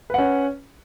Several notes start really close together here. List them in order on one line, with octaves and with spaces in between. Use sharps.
B4 F#5 C#4